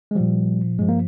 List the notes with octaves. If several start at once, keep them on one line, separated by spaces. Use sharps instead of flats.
G#3
A#2 F3 G3
G2 F3 G#3
A#3